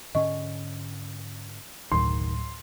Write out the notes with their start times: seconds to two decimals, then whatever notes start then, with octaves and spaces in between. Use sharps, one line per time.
0.15 G#2 D3 C#4 D#5 C#6
1.92 F#1 D2 A2 D#3 F#3 C6